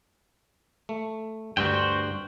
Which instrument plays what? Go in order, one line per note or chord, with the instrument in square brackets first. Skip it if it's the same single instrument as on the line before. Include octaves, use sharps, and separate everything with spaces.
[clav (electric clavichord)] A3
[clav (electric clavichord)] D2 G2 [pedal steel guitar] F#4 C5 G5